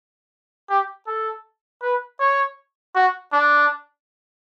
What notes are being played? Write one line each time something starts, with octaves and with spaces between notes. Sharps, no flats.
G4
A4
B4
C#5
F#4
D4